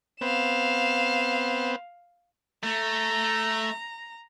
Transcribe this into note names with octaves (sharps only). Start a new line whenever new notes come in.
B3 C4 F5 E7
A3 A#5